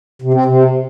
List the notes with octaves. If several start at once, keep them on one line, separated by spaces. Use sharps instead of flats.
C3
C4
C3